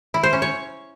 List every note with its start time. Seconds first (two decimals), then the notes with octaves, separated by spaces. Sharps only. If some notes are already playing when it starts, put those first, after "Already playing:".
0.14 E4
0.23 C5
0.33 C#4
0.42 C#5